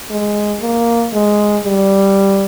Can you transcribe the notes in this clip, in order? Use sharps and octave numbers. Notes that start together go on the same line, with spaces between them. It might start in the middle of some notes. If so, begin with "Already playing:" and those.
G#3
A#3
G#3
G3